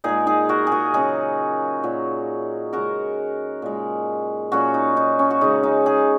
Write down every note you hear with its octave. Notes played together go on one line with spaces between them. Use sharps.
A#2 G#3 D#4 G#4
D#4 G#4
F#4 A#4
F#4 G#4 A#4
C#3 F#3 D#4 G#4
A#2 F#3
C#3 G#3 F#4 A#4
A#2 G#3
A#2 F#3 C#4 F#4
D#4
D#4
C#4
F#4
C#3 G#3 D#4
D#4
D#4 G#4